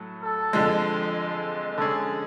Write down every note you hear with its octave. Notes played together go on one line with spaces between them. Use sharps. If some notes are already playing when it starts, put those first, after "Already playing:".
Already playing: A2 F#3 A3
A4
F2 D3 F3 G#3
D3 G#3 C#4 G#4 A4